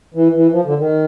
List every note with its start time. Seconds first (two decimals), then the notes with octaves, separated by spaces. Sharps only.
0.14 E3
0.34 E3
0.52 F3
0.65 D3
0.79 D#3